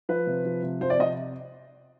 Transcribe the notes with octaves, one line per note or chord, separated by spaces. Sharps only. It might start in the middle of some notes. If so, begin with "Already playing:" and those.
F3 B4
C3
F3
C3
F3 C5
D5
C3 D#5